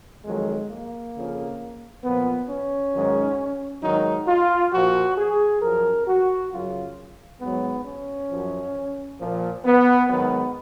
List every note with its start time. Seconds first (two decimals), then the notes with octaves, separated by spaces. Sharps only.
0.25 F2 D#3 F#3 G#3
0.70 A#3
1.14 F2 C#3 F3
2.04 A#2 F3 B3
2.49 C#4
2.94 G#2 D#3 F#3
3.83 G#2 D#3 F#3 D#4
4.27 F4
4.72 A#2 F3 F#4
5.17 G#4
5.62 F#2 F3 A#4
6.07 F#4
6.51 F#2 C#3 F#3 F4
7.41 G#2 F#3 B3
7.85 C#4
8.31 F#2 F3
9.20 A#2 F3
9.64 B3
10.10 G#2 D#3 F#3 B3